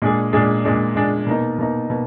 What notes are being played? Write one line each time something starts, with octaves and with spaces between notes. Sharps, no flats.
A#2 G#3 D4 G#4
A#2 G#3 D4 G#4
A#2 G#3 D4 G#4
A#2 G#3 D4 G#4
B2 A#3 D#4
B2 A#3 D#4
B2 A#3